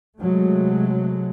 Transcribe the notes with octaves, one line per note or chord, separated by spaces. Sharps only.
C3 F#3 G#3 A3